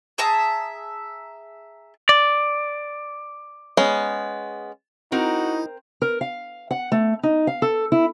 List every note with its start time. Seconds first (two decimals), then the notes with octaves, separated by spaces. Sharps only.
0.18 G#4 E5 A5 A#5
2.09 D5
3.77 G#3 B3 C#4
5.12 C4 D#4 E4 F#4 A#4
6.02 A#4
6.21 F5
6.71 F#5
6.92 A3
7.23 D#4
7.47 F5
7.62 A4
7.92 E4